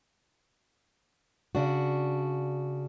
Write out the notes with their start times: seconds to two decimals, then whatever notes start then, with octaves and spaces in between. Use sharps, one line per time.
1.55 C#3 D4 F#4